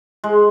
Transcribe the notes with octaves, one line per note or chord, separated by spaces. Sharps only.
G#3